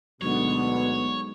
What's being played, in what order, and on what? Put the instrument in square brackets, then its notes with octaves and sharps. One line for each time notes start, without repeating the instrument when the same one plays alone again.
[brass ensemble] D2 B2 D3 [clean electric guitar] F#3 G#3 D#4 [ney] B3 [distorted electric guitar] C#5